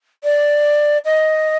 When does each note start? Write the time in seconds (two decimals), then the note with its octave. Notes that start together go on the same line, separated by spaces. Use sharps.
0.24 D5
1.05 D#5